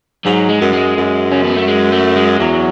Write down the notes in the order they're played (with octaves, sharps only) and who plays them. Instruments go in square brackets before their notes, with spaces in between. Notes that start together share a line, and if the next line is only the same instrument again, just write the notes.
[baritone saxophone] G#2 [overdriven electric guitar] F#3
[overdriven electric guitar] G#3
[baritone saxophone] F#2
[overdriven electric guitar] G#3
[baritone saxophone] F#2
[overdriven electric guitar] C#4
B3
A3
G#3
A3
G#3
[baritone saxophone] E2 [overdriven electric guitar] F#3